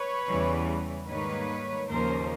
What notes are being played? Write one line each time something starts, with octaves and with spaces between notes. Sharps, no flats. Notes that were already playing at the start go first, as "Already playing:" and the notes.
Already playing: B4 C#5
E2 C#3 E3 G3
G#2 D#3 G3 A#3 B4 C#5
D#2 C#3 F3 A#3 C#4 A#4 C5